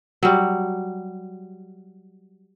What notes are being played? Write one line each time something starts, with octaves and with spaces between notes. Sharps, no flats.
F#3 G3